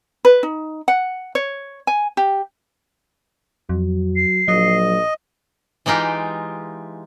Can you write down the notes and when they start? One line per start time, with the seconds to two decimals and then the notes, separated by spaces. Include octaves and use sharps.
0.25 B4
0.43 D#4
0.88 F#5
1.35 C#5
1.87 G#5
2.17 G4
3.69 F2 F#3
4.16 C7
4.48 A#1 F#3 D#5
5.86 E3 G#3 D#4 F4 G4